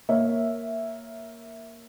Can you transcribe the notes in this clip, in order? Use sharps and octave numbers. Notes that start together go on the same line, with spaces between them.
A#3 C#5 E5